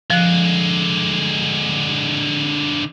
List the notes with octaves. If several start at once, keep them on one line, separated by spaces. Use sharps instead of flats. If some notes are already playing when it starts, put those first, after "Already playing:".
D3 F3 G#3 F#6